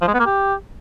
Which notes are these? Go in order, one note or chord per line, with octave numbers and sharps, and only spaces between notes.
F3
G#3
B3
A#3
G4